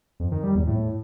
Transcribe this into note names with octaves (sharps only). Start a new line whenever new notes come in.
F2
D#3
G3
E2
A2